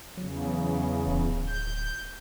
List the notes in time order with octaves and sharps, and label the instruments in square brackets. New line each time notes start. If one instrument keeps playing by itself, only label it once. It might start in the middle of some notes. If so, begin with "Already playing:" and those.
[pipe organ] E2 C#3 [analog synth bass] F#3
[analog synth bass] D1
[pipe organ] G6